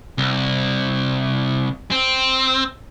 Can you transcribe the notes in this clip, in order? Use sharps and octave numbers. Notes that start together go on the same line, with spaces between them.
C2
C4